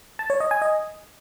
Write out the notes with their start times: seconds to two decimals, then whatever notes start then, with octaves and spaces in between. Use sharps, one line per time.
0.19 A5
0.30 C#5
0.40 D#5
0.51 G#5
0.62 D#5